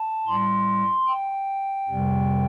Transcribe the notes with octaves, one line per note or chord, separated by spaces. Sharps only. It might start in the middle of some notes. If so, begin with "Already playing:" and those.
Already playing: A5
A2 G3 C6
G5
F2 C3 G3